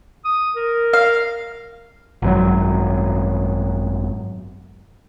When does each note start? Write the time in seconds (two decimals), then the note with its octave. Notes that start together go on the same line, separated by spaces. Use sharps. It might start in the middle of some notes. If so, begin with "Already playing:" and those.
0.25 D#6
0.56 A#4
0.93 F5
2.22 G#1 F#2 B2 F#3